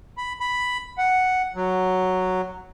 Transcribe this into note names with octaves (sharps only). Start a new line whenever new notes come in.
B5
B5
F#5
F#3